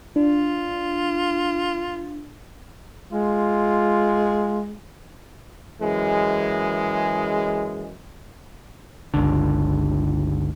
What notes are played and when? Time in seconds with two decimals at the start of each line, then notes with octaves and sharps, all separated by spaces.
0.16 D4 F4
3.13 G#3 F4
5.81 F#2 E3 G#3
9.14 G1 C#2 D3